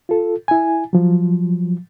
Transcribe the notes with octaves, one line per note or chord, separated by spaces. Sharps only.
F4 A4
E4 G#5
F3 F#3